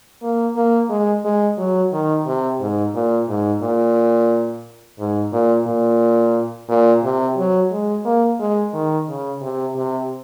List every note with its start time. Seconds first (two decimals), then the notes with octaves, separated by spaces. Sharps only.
0.23 A#3
0.56 A#3
0.90 G#3
1.25 G#3
1.58 F#3
1.93 D#3
2.26 C3
2.60 G#2
2.95 A#2
3.28 G#2
3.62 A#2
4.99 G#2
5.33 A#2
5.67 A#2
6.69 A#2
7.04 C3
7.37 F#3
7.71 G#3
8.05 A#3
8.40 G#3
8.74 D#3
9.08 C#3
9.41 C3
9.76 C3